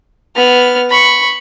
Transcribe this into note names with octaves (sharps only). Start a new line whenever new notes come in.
B3 F6
B5 C#6